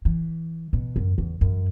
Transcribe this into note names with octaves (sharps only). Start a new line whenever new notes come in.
E3
B2
F#2
E2
F#2